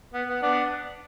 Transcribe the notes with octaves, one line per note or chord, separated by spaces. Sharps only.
B3
B3
B3 D4